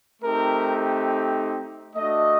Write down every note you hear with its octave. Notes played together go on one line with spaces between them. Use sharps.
A3 C4 D#4 G4 A#4
A3 D4 F#4 D#5